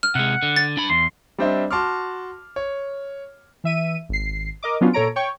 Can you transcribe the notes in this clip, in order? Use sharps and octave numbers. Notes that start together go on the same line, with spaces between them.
F6
C3 G#3 F#5
D3
A6
D4 B5
E2 C6
G3 C4 D4 C5 D#5 E5
F#4 A5 C6 D6 F6
C#5
E3 E5 D#7
G#1 C7
A#4 D#5 D6
F#3 B3 C#4 D4 F4
A#2 A4 C#5 A#5 D7
C#5 G5 C#6